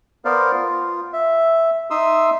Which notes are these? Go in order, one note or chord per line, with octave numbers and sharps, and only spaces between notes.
B3 A#4 C5 D5 F5
F4
E5
D#4 E5 C6 D#6 E6